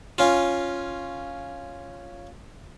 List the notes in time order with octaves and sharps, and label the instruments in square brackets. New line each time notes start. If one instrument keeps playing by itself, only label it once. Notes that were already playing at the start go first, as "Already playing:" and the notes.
[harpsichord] C#4 F4